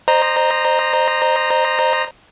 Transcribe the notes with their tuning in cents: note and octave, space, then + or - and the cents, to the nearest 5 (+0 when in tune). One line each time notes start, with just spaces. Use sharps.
C5 +0 D#5 -30 A#5 +0